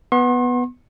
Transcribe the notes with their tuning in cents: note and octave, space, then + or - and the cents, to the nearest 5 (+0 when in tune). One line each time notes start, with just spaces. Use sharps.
B3 +0 C6 +40